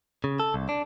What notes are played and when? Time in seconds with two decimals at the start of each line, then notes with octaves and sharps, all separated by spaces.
0.24 C#3
0.40 A4
0.54 C2
0.69 D4